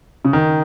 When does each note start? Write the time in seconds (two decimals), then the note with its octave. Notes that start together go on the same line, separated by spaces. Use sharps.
0.25 C#3
0.33 D#3